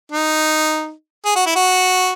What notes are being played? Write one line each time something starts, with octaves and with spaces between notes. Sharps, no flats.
D#4
G#4
F#4
E4
F#4